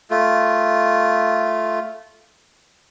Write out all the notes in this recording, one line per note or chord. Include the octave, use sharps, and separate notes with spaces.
A3 F4